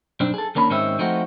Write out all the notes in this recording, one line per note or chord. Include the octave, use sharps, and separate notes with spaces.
B1 G2 C4 D4
G#4 A4
D#2 A#3 C#4 D4 B5
G#2 D#3 G#3 C4 C#4 E5
F3 A3 C4 D#4 F4 F#4